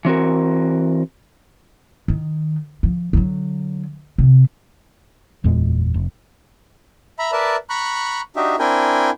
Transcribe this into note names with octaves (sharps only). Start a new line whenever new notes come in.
E3 C4 F#4 A#4
D#3
F3
D3 F#3
C3
F#1 E2 A#2 G#3
F1
E5 A#5 B5
A#4 B4 D5 E5 A5
A#5 B5 C#6 F#6
D4 D#4 F#4 G4 D#5 E5
C4 D4 E4 A#4 G5 G#5